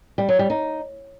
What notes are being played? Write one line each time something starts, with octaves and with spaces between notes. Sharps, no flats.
G3
F#3
G3
D#4